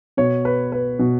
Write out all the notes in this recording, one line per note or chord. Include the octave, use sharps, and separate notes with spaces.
B2 C#5
B4
B4
B2